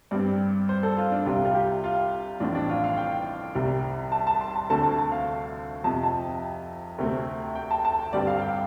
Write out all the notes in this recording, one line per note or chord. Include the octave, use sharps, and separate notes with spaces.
G2 G3 C4 D5
C5
A4
F4
D4
C2 C3 G3 F4
F4
G4
F4
A1 A2 F3 C4 D4
D4
F4
F5
G5
C2 C3 G3
A5
A5
C6
A5
D2 D3 A3 C4 A5
A5
A5
F5
F2 C3 F3 A5
A5
D2 C3 A3 C4
G5
A5
A5
G5
G1 G2 G3 C4 D5
F5
F5
G5